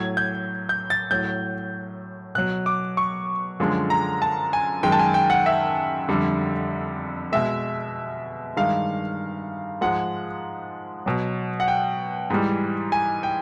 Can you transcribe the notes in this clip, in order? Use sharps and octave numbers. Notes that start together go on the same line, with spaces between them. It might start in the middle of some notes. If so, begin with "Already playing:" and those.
Already playing: A2 F#3 G#6
G6
G6
A6
A2 F#3 G6
B2 F#3 F#6
D6
C#6
F#2 D3 F3 G#3
A#5
A5
G#5
F#2 D#3 G#3 G5
A5
G#5
G5
F#5
E5
F2 D3 G3
B2 G#3 E5
G2 D#3 G#3 F5
G#2 F3 G#3 F#5
B2 F#3
F#5
G5
G#2 E3 G3
G#5
G5